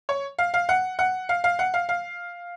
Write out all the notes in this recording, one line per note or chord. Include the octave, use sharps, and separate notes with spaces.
C#5
F5
F5
F#5
F#5
F5
F5
F#5
F5
F5